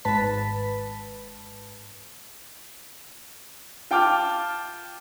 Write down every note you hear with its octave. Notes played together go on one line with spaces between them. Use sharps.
G#1 G#2 B4 A5 B6
F4 G5 A5 D6 F6